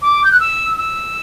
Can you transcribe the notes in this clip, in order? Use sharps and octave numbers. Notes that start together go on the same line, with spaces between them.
D6
G6
F#6
E6
E6